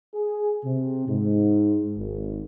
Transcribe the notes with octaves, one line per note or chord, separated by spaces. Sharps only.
G#4
C3
G#2
G#1